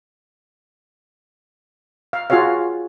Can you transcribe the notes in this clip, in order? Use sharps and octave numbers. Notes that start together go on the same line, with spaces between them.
F5
F4 F#4 G#4 C#5 F5